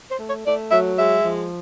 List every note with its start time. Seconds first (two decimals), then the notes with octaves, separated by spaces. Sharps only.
0.10 C5
0.19 A3
0.28 C#5
0.46 A3 D5
0.71 F#3 E5
0.98 G#3 E5
1.24 F3